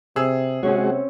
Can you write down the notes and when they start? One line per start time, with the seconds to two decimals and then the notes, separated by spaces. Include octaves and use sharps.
0.16 C3 G#4 E6
0.63 C3 G#3 C4 C#4 F#4 C#5